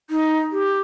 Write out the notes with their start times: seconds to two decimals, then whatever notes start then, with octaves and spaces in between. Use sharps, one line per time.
0.10 D#4
0.52 G4